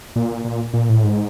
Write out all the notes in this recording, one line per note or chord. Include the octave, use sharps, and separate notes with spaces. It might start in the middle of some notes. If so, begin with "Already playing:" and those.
A#2
A#2
A#2
A2
G#2